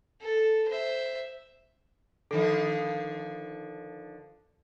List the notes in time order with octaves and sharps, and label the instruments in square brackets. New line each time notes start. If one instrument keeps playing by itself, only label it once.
[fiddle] A4
C5 E5
[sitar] D3 D#3 F3 [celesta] A4